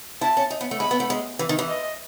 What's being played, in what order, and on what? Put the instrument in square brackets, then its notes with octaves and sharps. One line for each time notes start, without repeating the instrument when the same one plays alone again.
[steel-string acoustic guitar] E4 [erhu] A5
[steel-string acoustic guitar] C#4
D#4
B3
A3
[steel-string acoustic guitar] G#3 [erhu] B5
[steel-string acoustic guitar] B3
A3
G#3
E3
D#3
E3
[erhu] D#5